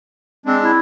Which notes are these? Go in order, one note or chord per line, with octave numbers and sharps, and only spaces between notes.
G#3 C4 D4
E4